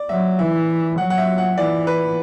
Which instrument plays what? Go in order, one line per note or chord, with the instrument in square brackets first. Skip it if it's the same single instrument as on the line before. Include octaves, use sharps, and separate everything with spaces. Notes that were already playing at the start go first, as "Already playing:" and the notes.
Already playing: [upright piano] D5
[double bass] F#3 [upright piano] E5
[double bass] E3 [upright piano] E5
[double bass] F#3 [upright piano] F#5
[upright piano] F#5
E5
F#5
[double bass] E3 [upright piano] D5
[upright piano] B4